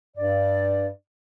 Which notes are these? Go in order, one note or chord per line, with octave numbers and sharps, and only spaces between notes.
G2 D5